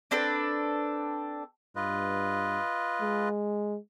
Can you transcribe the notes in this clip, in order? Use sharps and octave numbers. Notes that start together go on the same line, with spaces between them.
C4 D4 A4 B4
G2 F4 B4 D#5
G#3